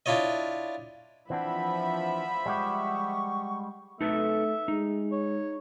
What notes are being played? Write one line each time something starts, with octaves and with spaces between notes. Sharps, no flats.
D4 E4 F4 C#5 D#5
E3 F3 C4 D4 E5 F#5 B5
G3 G#3 G4 F#5 C#6
A3 D#4 A4 B4 E5
G#3 D#4
C#5